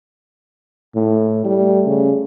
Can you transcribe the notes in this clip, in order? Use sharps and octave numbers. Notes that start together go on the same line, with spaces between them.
A2
G3 A3
C#3